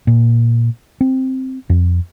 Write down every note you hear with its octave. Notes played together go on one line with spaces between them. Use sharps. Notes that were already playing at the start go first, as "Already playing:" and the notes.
A#2
C4
F2